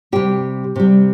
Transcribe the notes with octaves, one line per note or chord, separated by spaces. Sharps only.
C3 G3 G4
C3 G3